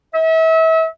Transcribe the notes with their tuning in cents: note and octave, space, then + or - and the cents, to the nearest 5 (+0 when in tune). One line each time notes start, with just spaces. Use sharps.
E5 -35